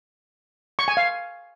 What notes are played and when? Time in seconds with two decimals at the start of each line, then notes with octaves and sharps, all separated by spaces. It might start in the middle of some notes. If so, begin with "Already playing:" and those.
0.79 C#6
0.88 G#5
0.97 F5